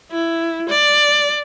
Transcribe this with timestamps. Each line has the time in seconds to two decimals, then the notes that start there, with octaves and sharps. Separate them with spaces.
0.12 E4
0.69 D5